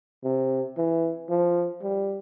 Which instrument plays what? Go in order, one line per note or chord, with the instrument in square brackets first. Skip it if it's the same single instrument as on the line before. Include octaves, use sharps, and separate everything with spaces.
[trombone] C3
E3
F3
G3